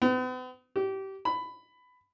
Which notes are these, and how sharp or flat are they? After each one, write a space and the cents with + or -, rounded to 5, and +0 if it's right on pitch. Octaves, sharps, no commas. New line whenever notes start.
B3 +45
G4 -25
B5 +15